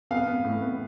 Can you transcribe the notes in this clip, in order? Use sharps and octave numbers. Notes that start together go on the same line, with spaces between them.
B3 F5
B3
A2
B3